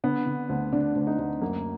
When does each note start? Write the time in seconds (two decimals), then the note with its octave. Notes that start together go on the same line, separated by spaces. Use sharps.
0.04 D3 B3
0.26 D3
0.49 D2
0.73 D3 D4
0.95 D2
1.07 D#4
1.18 D2
1.42 F#2 A#3